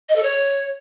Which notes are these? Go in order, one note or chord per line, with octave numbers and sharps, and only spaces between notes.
D#5
A4
C#5